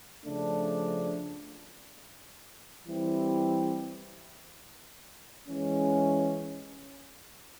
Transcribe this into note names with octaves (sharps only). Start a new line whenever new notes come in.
C#3 F3 A3 D4
E3 G3 C4 E4 G4
E3 G#3 C#4